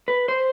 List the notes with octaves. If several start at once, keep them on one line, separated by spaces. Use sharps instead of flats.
B4
C5